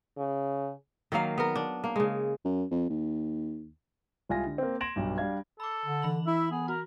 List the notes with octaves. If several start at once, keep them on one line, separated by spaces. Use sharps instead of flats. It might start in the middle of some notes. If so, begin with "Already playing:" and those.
C#3
D#3 F#3 A#3 F5
B3 A#4
D4
A#3
C#3 G#3
F#2
F2
D#2
C2 G#3 F4 G#5 A#6
D3
A#3 C4
C6 G#6 A#6 D7 E7 F#7
B1 G2
G3 D4 F5 G#6
A4 B5 D6
D3
E3 B5 F#7
E4 E5
B3 G#4
F#4 A#4